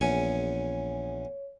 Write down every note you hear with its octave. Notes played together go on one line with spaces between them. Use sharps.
A#1 E2 C#4 C#5 G#5